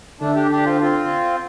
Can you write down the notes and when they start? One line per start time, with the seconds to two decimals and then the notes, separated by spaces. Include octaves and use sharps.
0.20 D3 A3 D4
0.36 D4 G4
0.51 D4 G4
0.66 C4 F4
0.81 C4 F4